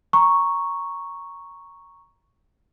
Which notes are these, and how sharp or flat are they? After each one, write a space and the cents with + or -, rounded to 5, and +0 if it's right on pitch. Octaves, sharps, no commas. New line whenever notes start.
A#5 +0 C#6 +0